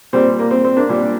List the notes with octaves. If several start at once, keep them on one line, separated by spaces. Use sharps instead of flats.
A#2 G3 C4
A#3
C4
C4
A#3 D4
A#2 G3